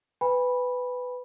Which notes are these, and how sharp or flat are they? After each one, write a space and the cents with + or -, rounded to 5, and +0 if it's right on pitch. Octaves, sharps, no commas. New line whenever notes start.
B4 +15 G#5 -40 B5 -10